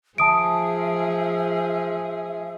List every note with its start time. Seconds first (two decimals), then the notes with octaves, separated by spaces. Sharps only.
0.18 F3 G#4 E5 A5 D#6 D7